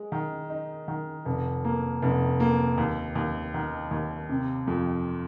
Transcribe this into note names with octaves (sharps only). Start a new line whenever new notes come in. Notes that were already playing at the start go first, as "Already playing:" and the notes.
Already playing: G#3
D#3
D#4
D#3
F1
A#3
F1
A#3
D#2
D#2
D#3
D#2
C3
F2